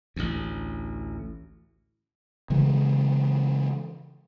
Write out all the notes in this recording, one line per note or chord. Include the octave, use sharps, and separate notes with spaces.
A1 D2
C#3 E3 G#3